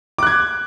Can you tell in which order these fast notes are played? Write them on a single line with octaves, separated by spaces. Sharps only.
D6 F#6 G#6